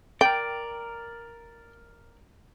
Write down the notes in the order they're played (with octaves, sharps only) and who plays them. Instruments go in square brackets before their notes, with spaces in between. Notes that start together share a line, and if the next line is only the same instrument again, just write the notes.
[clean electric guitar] A#4 D5 [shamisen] G5